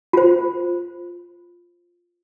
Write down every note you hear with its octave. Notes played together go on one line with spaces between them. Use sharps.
F4 C5